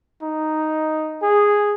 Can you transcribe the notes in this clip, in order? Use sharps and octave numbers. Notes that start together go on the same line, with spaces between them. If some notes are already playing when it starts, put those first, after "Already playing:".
D#4
G#4